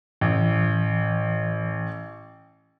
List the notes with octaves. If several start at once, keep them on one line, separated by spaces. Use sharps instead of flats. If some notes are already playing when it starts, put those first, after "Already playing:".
A1 E3